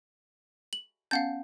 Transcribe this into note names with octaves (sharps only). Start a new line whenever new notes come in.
F#7
B3 C#4 F5 F#5 G6